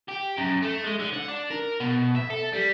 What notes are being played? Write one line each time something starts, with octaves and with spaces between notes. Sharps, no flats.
G4
F#2
A3
G#3
D3
F#5
D4
A#4
B2
E5
A4
G3